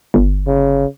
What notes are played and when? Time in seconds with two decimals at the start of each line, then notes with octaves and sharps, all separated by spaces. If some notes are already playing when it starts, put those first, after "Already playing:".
0.14 G1
0.47 C#3